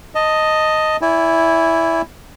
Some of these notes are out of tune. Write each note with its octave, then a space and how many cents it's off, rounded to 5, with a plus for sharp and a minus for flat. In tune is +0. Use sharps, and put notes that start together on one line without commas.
D#5 +0 A5 +15
E4 +0 D5 -40 G#5 -25